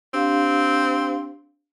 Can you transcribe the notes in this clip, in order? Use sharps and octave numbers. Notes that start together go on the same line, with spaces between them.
C4 D4 G4 F5